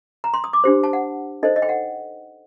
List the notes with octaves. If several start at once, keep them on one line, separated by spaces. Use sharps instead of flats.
A#5
C6
D#6
D6
D4 G4 C5
A5
F#5
D#4 A4 C5 D#5
D#5
G5
F#5